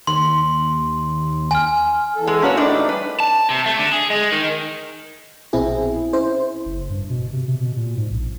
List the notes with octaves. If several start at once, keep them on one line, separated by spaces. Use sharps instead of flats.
D#2 C6
G#5 F6
E2 A4
G#3 G#4
A#3 C#4 F#4 A#4 B4 C#5
A2 A3 D4 D#4 D5
G3 B4
A5
C3
A3
D3
G#4
G#3
D#3
A#1 B2 C4 E4 G#4
C#4 E4 C5
F#1
G2
B2
C3
C3
B2
A#2
G#2
A#1